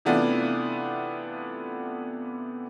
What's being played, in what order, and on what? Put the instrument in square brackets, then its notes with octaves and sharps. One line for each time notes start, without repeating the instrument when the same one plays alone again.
[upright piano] C3 E3 A3 B3 D4 F4